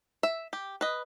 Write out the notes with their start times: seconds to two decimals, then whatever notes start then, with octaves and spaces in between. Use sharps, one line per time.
0.23 E5
0.53 G4
0.81 B4 D#5